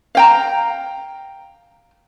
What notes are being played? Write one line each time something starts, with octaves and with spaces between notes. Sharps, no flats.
F5 G5 A#5